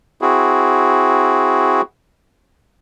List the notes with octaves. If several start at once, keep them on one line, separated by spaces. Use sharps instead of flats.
C4 E4 F#4 G#4